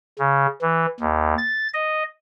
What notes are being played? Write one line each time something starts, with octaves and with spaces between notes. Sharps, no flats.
C#3
E3
D#2
A6
D#5